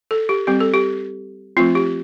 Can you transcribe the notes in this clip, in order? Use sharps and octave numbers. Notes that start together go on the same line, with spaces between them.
A4
G4
G3 C4 G4
A4
G4
F3 A3 C4 F4
G4